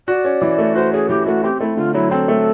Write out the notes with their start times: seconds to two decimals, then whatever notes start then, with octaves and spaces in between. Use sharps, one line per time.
0.08 F#4 D5
0.25 C#4
0.41 E3
0.58 A3
0.75 F#4 C5
0.93 C#4 G#4
1.09 E3 G4
1.26 A3 F#4
1.44 C4 G4
1.60 A3 E4
1.77 D3 F4
1.94 F#3 E4
2.11 C4 A4
2.28 A3